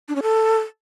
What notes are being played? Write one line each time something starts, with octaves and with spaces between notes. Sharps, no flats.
D4
C#4
A4